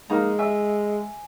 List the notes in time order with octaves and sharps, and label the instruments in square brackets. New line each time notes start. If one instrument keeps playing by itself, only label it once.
[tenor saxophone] G#3 [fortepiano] A#3 D#4 A#5
[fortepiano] E5 [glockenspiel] G#5